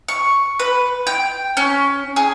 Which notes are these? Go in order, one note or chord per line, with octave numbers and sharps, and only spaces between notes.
C#6
B4
G5
C#4
G#4